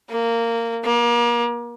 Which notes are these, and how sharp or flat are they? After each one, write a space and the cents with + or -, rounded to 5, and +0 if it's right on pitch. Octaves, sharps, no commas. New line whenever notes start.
A#3 -15
A#3 +35